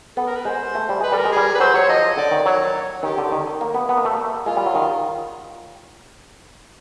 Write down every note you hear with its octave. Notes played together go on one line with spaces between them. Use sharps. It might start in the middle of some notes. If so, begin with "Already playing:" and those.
B3 A4
A#4
B4
G#3 C5
A3
G3
G#3 B4
G3 A4
A#4
G#3
G3 G#4
B4
F#3 C5
F#3 C#5
F3 D#5
D3 D5
D#3
F#3 C#5
D#3 G4
D3
D#3
A#3
B3
B3
A#3
A3
A#3
G#3 F4
G3
F#3
D#3